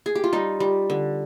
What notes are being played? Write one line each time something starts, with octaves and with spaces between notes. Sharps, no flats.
G#4
G4
F4
G3 D#4
G3
D3